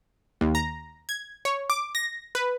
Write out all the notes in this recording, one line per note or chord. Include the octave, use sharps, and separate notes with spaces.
D#2
A#5
G#6
C#5
D6
A#6
B4